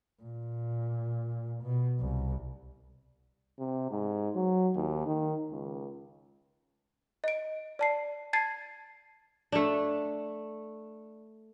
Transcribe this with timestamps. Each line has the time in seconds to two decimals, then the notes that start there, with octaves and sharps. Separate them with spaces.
0.23 A#2
1.63 B2
2.00 C2
3.59 C3
3.91 G#2
4.35 F#3
4.75 D#2
5.07 D#3
5.52 C#2
7.24 D#5 D7
7.79 D5 A5 C7
8.33 A5 G#6 A6 C7
9.52 A3 D4